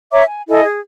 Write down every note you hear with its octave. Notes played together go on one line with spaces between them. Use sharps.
C#5 E5 A#5 D6
G#5
E4 A4 D#5 G#5
G#4